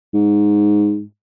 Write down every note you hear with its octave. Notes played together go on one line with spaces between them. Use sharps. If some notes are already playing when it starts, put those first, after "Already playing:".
G#2